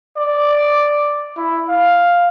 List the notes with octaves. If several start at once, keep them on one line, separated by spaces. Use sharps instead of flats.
D5
E4
F5